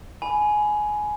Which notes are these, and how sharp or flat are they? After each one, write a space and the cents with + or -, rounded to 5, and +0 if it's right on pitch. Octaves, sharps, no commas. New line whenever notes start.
G#5 +15 B5 +0